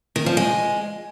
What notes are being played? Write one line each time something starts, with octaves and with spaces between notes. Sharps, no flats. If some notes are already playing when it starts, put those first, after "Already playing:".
D#3
F3
G#3